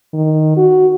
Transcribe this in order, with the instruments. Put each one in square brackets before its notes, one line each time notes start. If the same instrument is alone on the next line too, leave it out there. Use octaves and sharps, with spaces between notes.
[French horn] D#3
F#4